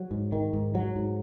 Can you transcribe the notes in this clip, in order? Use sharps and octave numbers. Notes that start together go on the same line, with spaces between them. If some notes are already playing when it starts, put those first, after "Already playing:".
Already playing: F#3
G#2
D#3
G#2
F#3
G#2